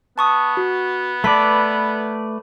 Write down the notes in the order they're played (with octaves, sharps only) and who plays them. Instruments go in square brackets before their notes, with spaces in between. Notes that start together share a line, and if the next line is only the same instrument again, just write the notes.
[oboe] B3 [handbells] A5 C#6 D#6
[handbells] F#4
[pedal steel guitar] A3 B4 D5 [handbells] A5 B6